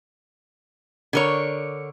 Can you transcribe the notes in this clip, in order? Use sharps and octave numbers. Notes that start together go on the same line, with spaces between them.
D3 A#4 C#5